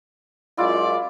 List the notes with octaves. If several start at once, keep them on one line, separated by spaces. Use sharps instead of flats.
F#2 G#3 E4 F4 D5